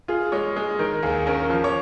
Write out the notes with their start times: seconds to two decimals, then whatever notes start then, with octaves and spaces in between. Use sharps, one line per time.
0.08 F4 G#4
0.32 G#3 C#5
0.56 G#3 G#4
0.79 D#3 A#4
1.03 D#2 G#4
1.27 C#4 A#4
1.50 F3
1.64 C#5